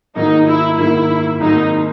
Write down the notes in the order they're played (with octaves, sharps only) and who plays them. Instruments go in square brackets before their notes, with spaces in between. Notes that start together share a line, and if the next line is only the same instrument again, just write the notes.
[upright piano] G#2 D#3 F#3 A#3 [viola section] D#4
[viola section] E4
[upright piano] G#2 D#3 F#3 A#3 [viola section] E4
[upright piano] G#1 G#2 F#3 A#3 [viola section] D#4